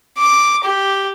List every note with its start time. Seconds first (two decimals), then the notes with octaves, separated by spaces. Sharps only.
0.18 D6
0.64 G4